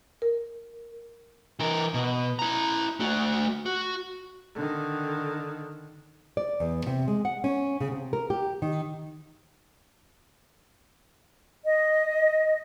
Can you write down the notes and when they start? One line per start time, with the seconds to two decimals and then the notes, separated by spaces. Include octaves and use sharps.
0.22 A#4
1.60 E3 A#4
1.94 B2
2.39 E4 A#5
3.00 A3 F#4
3.66 F#4
4.54 D3 D#3
6.37 D5
6.60 E2
6.86 C3
7.08 G#3
7.25 F#5
7.44 C#4
7.80 C#3
7.92 C3
8.13 A#4
8.30 G4
8.62 D#3
11.64 D#5